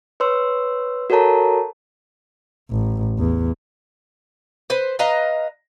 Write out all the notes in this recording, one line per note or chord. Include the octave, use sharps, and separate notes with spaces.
B4 C#5 C6 E6
F#4 A4 A#4 C#5 A5 A#5
A1
E2
B4 C5
B4 D#5 F5 A#5